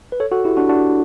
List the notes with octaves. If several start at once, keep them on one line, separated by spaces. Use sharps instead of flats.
B4
A4 C#5
F#4 A4
E4 G4
D4 F#4
D4 F#4